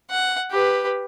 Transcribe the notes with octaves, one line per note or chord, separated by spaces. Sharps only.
F#5
G4 B4